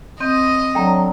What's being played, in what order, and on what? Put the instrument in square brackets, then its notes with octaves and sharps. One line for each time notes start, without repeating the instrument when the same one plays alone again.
[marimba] C4 G6 [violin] D#5
[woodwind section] D3 F#3 [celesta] G5 A#5